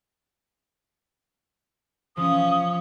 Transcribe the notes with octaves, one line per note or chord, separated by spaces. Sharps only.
F3 C#4 D#6